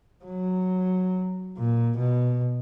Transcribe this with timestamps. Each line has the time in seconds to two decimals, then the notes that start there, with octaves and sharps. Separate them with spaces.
0.25 F#3
1.57 A#2
1.97 B2